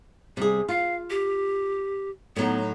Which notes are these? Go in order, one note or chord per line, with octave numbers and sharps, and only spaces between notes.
C3 G3 G#4
F4 F5
G4
A2 F#3 B3 D#4